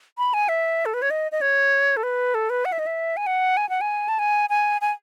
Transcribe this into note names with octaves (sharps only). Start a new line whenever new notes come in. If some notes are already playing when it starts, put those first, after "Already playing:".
B5
G#5
E5
A4
B4
C#5
D#5
D#5
C#5
A4
B4
A4
B4
F#5
E5
D#5
E5
G#5
F#5
G#5
F#5
G#5
A5
G#5
G#5
G#5